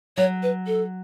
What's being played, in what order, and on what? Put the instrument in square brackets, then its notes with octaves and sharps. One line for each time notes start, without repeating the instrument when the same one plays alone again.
[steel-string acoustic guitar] F#3 [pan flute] C#5
[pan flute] B4
A4